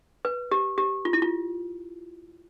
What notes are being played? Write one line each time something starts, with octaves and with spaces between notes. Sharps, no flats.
B4
G4
G4
F4
E4
F4